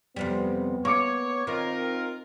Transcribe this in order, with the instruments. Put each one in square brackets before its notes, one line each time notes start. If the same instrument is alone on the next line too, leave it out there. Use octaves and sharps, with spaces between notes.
[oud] F2 C3 G3 [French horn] B3
[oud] A#3 [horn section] C#5 [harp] C#6 D6 C#7
[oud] D#3 [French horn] C4 [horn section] F4 A#4